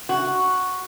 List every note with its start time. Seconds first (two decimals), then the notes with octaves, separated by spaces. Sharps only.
0.09 F#4